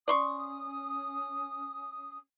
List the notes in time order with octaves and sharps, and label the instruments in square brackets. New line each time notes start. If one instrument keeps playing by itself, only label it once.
[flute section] C#4 D#6 [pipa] D5 C6 C#6